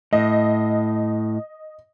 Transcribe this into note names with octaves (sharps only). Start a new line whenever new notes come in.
A2 D#5